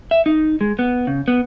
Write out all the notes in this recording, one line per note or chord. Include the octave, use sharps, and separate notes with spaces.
E5
D#4
G#3
B3
C#3
B3